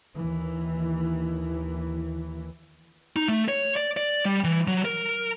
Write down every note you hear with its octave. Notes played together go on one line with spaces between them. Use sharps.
D#2 D#3 E3
D#4
A3
C#5
D5
D5
G3
E3
F#3
A#4